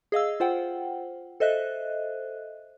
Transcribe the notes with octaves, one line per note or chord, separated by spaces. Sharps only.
G#4 D#5 F5 E6
F4 C5 F#5 G5
A4 C5 D#5 E5 F#6